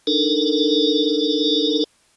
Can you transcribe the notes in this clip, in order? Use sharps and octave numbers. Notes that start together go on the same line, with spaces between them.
D4 D#4 A4 A#4